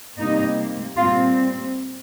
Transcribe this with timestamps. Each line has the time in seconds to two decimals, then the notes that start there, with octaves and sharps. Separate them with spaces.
0.17 C3 G3 A#3 D#4
0.96 A#2 G3 C4 F4